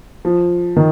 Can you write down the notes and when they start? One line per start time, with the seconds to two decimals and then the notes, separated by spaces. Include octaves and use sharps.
0.25 F3
0.76 D#3